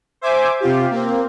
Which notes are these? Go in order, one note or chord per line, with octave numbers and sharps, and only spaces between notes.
C5 E5 G#5 D6
C3 F4 G4
A#3 C4